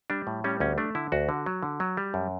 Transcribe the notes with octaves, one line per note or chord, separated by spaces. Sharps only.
G3 D4
A2
G3 C#4
D2 C#4
A3 D4
D3 E4
D2 F#4
D3
F#3
D3
F#3
G3
F#2